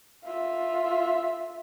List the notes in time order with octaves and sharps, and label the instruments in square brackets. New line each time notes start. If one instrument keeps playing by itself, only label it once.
[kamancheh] F4 E5